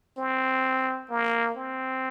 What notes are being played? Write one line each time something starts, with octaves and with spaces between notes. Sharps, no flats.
C4
A#3
C4